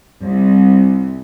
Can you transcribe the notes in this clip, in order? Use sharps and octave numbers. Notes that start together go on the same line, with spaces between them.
C2